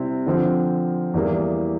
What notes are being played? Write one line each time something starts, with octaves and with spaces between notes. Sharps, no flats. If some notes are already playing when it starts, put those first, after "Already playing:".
Already playing: C3 G3 C4 E4
D3 F3 C4
E2 E3 G3 A#3 E4